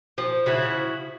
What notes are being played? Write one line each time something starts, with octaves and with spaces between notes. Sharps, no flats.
F3
C#3 E4 F#4